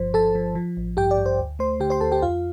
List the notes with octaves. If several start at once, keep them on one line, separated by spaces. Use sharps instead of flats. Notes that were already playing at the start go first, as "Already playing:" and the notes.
Already playing: G1 G2 F3 C5
F3 A4 A5
F3
F3
A1
G2 G4 G5
D5
G2
C5
D2
A3 C5 C6
D3 G4 G5
C5 C6
D2 A4 A5
G4 G5
F2 F4 F5